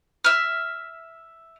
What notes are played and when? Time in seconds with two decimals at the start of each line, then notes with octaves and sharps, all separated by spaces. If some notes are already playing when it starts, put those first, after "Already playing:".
0.24 E5 F6